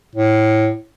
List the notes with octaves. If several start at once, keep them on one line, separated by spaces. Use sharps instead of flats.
A2